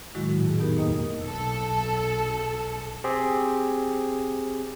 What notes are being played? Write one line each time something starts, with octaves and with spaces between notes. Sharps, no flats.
A2 D#3 F#3 G#3 E4 F#4
A#2
F2 G#4
B3 D#4 G4 A#4
D#2 B2 A#3 D#4 D#5 D#6
B1 A4
C4 G4 G#4